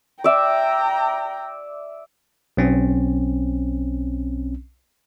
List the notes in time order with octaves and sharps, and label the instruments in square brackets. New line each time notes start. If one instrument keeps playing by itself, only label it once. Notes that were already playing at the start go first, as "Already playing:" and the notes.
[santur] D5 E5 [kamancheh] G5 A#5
[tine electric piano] B1 C4 C#4